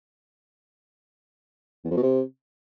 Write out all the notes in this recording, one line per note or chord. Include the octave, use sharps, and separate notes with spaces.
E2
F2
B2
C3